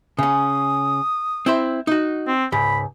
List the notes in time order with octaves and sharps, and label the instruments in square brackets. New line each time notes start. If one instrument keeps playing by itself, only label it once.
[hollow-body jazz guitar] C#3 C#4 [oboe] D#6
[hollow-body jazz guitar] C4 E4 C5
D#4 F#4
[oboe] C4
[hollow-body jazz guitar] C#2 G#2 [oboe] B5